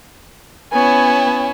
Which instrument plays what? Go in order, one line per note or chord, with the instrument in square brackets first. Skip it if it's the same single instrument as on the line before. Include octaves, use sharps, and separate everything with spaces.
[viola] B3 [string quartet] C#4 E4 C#5 [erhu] G#5